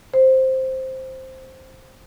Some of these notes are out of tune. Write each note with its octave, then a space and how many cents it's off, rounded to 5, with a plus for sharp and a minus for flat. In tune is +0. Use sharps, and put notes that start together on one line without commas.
C5 +5